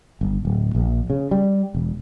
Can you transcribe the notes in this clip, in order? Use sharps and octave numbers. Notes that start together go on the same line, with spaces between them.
G1
D1
A#1
C#3
G3
E1